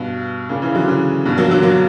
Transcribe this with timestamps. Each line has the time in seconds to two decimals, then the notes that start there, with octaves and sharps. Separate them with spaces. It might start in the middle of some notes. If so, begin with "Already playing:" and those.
Already playing: G2 B2
0.49 A#2 C#3
0.62 C#3 E3
0.75 D3 F#3
0.87 C#3 E3
1.25 G2 B2
1.37 F#3 A#3
1.51 D3 F#3
1.63 F#3 A#3